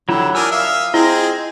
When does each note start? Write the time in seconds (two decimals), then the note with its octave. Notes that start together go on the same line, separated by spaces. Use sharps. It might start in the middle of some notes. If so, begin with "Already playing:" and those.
0.09 D3 F#3 E4 F4 G4
0.35 D4 A#4 G#5 D#6 E6
0.51 E5 F5
0.94 C4 E4 F4 G#4 D#5